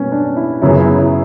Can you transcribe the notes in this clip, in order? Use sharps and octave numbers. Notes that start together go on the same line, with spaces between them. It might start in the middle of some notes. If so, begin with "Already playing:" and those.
Already playing: B2 G3 A#3 B3 C#4
D4
E4
F#2 C#3 F#3 B3 E4
E4
E4